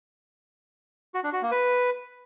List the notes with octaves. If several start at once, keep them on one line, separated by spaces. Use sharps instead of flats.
F#4
D4
F#4
A#3
B4